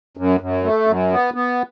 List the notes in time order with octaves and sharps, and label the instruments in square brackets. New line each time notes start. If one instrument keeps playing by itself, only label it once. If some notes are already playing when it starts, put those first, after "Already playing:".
[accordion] F#2
F#2
A3
F#2
B3
B3